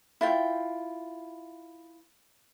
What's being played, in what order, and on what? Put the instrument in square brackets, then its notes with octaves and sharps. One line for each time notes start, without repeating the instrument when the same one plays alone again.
[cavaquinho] E4 F4 G5